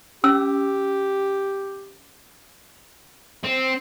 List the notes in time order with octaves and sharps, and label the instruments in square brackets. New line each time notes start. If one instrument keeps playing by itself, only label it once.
[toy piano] C#4 E6 [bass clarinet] G4
[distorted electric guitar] C4